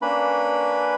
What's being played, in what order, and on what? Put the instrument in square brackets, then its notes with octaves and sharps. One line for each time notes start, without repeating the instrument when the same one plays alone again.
[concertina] A#3 C#4 D4 B4 B5